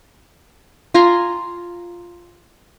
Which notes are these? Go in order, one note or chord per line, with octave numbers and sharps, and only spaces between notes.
F4 G#5 A#5 C6